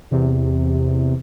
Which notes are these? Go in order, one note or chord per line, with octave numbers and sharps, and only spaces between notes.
E2 C3